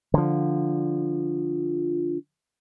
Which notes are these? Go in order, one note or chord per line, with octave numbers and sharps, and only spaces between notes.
D3 F3